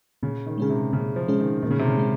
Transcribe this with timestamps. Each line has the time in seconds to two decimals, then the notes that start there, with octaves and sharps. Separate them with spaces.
0.23 A#2 C#3
0.46 D#3
0.58 C#3 G#3 C#4 G#4
0.70 C3
0.92 A#2 C#3
1.16 F3
1.28 G#3 C#4 G#4
1.40 D#3
1.63 A#2 D#3
1.71 C#3
1.79 C3
1.88 C#3
1.97 G#3 C#4